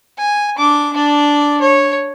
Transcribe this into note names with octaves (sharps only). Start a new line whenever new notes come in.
G#5
D4 D6
D4 D5
C#5